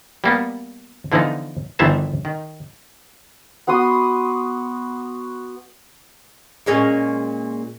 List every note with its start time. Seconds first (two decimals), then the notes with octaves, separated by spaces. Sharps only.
0.24 G3 A#3 B3
1.12 D3 E3 F3 B3 D#4
1.79 G1 D#3 E3 C5 E5 A5
2.25 D#3
3.67 B3 F#4 C6 D#6
6.66 A#2 G#3 C#4